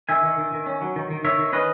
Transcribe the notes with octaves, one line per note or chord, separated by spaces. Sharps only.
D#3 E5 G#5
D#3
D#3
D#3
C#4
F#3
D#3
D#3
D#3 C#5 E5
D#3
C#4 B4 D#5